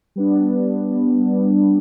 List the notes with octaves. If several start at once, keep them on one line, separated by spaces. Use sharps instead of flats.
G3 B3 D4